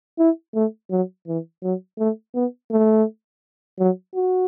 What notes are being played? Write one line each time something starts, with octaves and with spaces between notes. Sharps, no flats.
E4
A3
F#3
E3
F#3
A3
B3
A3
F#3
F#4